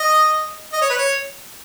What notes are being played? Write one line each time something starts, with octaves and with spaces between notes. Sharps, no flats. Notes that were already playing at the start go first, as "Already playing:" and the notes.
Already playing: D#5
D#5
C#5
B4
C#5